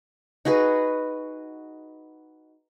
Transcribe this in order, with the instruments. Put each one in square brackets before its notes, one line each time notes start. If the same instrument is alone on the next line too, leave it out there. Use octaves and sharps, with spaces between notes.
[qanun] D#4 F#4 G#4 B4